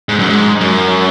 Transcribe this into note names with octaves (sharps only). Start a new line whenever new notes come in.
G#2
F#2
G#2
F#2